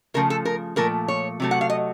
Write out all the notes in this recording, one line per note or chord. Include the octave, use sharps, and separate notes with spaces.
C#3 F3 A3 A#4
A4
A#4
A#2 F3 A3 A#4
C#5
C3 F#3 A3
F#5
F5
D#5